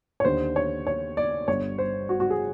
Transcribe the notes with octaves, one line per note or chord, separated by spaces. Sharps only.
C#5
D#2 D3 C5
C#5
C#5
D5
G1 G2 D3 C#5
C5
F#4
F#4
G#4